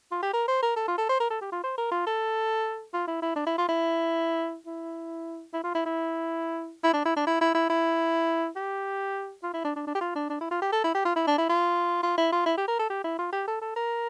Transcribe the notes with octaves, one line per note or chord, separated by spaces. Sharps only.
F4
G4
A#4
C5
A#4
A4
F4
A4
C5
A#4
A4
G4
F4
C5
A#4
F4
A4
F4
E4
E4
D4
E4
F4
E4
E4
E4
F4
E4
E4
E4
D4
E4
D4
E4
E4
E4
E4
G4
F4
E4
D4
D4
D4
G4
F4
D4
D4
E4
F4
G4
A4
E4
G4
F4
E4
D4
E4
F4
F4
E4
F4
E4
G4
A#4
A4
G4
E4
F4
G4
A4
A4
A#4